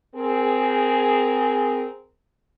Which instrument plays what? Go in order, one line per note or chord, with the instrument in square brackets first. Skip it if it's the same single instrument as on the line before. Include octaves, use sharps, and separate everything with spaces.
[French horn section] C4 G#4 A#4